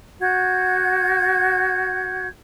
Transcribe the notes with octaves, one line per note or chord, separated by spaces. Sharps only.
F#4 F#5 G6 G#6